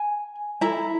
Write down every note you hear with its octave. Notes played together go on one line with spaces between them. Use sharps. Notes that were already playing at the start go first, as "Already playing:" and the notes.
Already playing: G#5
E4 A4 A#5